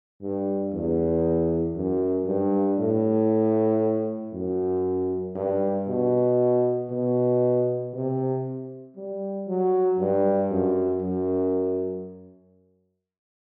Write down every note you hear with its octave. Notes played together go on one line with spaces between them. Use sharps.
G2
E2
F#2
G2
A2
F#2
G2
B2
B2
C3
G3
F#3
G2
F#2
F#2